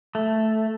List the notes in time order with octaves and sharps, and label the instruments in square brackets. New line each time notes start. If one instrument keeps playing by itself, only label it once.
[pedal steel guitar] A3